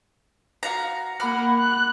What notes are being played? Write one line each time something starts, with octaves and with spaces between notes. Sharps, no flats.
F#4 F5 A#5
A#3 F#5 B5 D6 F6
F#6